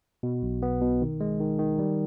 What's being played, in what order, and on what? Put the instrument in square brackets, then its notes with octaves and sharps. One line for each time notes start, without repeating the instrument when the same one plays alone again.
[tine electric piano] B2
B1
B3
B2
D#3
G#3
D#3
D#3
G3